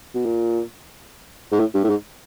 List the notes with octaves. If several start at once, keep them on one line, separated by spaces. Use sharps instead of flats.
B2
A#2
G#2
A2
G2
A2
G#2